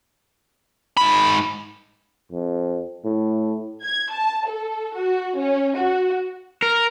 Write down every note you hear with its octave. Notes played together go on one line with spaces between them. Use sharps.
G#2 B5
F2
A2
G#6
A5
A4
F#4
C#4
F#4
A#4